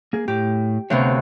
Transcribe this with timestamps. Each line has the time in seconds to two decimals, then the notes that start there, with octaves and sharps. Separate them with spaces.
0.13 A#3 G#4
0.28 A2 G4
0.90 D2 C3 B3 C#5 F5